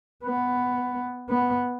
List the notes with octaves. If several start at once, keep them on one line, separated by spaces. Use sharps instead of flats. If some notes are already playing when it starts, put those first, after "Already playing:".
B3
B3